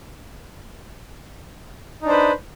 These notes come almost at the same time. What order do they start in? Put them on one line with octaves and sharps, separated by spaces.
D#4 D4 C5 B4